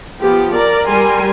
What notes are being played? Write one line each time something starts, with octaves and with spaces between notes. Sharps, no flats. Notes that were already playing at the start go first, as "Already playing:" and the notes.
F3 B3 G4
A#4 D5
G3 G4 A#4 G#5 C6